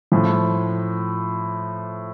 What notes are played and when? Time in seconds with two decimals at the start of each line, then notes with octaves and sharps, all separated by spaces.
0.12 A2 F3